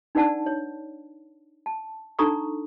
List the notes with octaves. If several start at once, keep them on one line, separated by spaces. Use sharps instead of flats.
D4 D#4 B4 D5 F#5 A5
C#5
A5
D4 D#4 A4 A#5 C#6 D#6